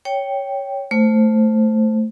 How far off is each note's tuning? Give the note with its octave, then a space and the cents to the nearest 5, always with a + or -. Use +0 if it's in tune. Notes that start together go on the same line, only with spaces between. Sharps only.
C#5 +5 G5 +0
A3 +0 C5 +0